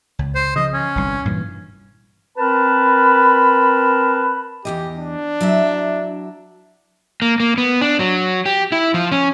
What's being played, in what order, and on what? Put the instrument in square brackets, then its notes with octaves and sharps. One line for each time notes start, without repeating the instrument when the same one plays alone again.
[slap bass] C#2
[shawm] C5
[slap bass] C#3 F3 [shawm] D#5
[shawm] C#4
[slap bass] G1 C2 G2
G2 A#2 E3
[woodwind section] C4 A#4 B4 A5 B5
[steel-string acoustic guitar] E2 D#3 D#5 [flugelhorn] G4
[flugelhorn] D4
[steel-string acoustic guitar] F#3 E4 E5
[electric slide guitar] A#3
A#3
B3
D4
F#3
G4
E4
F3
C#4